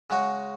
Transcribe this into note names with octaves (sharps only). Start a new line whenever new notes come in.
C#3 G#3 F#4 C#5